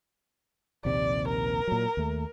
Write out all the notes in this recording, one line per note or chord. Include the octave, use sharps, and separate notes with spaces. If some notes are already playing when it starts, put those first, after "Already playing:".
A#1 D#2 C3 D5
A#4
A#2 F#3
D#2 A3